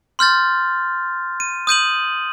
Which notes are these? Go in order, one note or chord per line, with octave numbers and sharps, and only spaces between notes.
C6 F6 G6 A6
D#7
D#6 G6 D#7 F#7